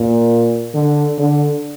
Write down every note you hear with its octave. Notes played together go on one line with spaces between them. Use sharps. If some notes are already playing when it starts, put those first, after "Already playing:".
Already playing: A#2
D3
D3